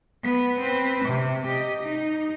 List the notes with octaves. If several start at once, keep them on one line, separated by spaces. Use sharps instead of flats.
B3 B4
C4 B4
C3
G4 D#5
D#4